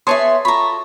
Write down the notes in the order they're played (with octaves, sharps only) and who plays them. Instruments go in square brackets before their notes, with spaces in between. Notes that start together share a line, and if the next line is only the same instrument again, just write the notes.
[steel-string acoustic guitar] B3 G#4 E5 [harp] C#5 A5 D#6 [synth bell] C6
[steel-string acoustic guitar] F4 A4 [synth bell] A#5 B5 [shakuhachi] C#6